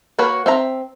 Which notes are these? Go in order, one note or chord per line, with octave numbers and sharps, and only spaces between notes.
A#3 F#4 B4 C#5
C4 E5 A#5